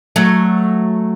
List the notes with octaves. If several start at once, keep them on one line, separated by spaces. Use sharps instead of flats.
F#3 A3